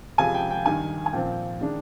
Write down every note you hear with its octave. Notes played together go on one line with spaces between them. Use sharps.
F2 C3 F3 G#3 G#5
G5
G5
G2 D#3 G3 G#5
G#5
A#2 F3 C4 G5
D#3 G#3 D4